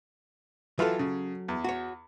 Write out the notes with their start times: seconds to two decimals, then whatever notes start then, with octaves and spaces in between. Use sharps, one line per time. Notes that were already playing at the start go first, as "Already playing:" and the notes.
0.79 E3 F#3 F4 A4
0.99 C#3
1.48 E2
1.64 F#4 C#5